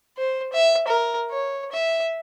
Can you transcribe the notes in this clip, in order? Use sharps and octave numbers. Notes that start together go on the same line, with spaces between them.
C5
E5
A#4
C#5
E5